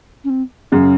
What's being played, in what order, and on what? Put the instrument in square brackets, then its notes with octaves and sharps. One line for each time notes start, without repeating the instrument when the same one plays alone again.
[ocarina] C#4
C4
[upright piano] F#2 C#3 [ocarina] C#4